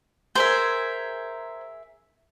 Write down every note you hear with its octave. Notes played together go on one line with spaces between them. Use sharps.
G#4 A#4 C5 E5